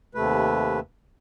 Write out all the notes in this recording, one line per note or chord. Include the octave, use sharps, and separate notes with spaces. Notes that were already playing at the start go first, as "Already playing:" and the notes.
D#2 C3 A3 B4